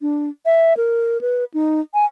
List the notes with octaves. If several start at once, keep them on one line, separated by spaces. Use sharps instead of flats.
D4
E5
A#4
B4
D#4
G#5